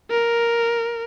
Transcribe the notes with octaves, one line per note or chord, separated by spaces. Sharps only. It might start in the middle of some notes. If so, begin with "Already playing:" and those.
A#4